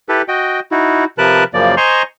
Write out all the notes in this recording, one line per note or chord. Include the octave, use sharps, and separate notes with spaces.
E4 G4 A4 B4
F#4 D#5 G5
D#4 E4 F#4
C3 F3 A#4 B4 A5 F#6
F#2 C#3 F3 A#3 D5
C5 D#5 G#5 A#5 C6 C#6